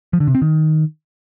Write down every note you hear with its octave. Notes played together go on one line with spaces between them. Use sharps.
F3
D3
C3
C4
D#3